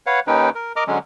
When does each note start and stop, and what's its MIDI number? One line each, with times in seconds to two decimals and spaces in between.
0.06 0.20 71
0.06 0.20 73
0.06 0.20 77
0.06 0.20 78
0.27 0.50 39
0.27 0.50 51
0.27 0.50 61
0.27 0.50 63
0.27 0.50 71
0.27 0.50 79
0.55 0.72 70
0.76 0.84 70
0.76 0.84 75
0.76 0.84 82
0.76 0.84 86
0.76 0.84 89
0.87 0.98 50
0.87 0.98 54
0.87 0.98 56
0.87 0.98 61